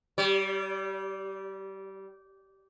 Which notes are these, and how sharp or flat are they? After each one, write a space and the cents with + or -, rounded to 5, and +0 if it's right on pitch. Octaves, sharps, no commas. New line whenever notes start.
G3 -20 C#5 +45